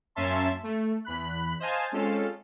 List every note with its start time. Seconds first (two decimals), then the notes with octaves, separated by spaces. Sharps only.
0.15 F#2 A#3 C#4 E5 A5 C6
0.63 A3
1.05 E2 B5 F#6
1.60 C5 D#5 F5 G#5 A5
1.92 G#3 C4 C#4 F4 A4